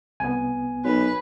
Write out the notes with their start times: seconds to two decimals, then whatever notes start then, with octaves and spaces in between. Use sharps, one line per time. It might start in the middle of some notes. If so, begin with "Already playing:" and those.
0.20 C2 B3 G#5
0.84 B1 B4